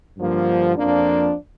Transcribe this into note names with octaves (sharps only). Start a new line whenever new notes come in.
G2 D3 F3 A#3
F2 F3 A#3 D4